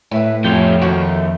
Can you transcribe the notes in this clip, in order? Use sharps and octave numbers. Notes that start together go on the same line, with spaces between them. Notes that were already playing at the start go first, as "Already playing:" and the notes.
A2 B4 E5 G#5
F2 F3 G3 C#4 E4 F4 G5
D#2 E3 F3 A3 F#4